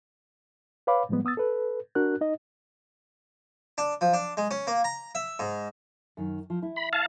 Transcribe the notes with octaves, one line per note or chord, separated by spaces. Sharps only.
B4 C#5 F5 B5 D6
A2 F3 G3 G#3 B3
B3 D#6 E6 A6
A4 B4
D4 F#4 A#4 F#6
D#4 D#5
D4
F3
D4
G#3
C#4
A#3
A#5
E5
G#2
F#2 D#3
F3
E4
B5
F5 A5